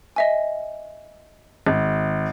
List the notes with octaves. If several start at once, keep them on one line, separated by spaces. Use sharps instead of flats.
D#5 E5 G#5
G#1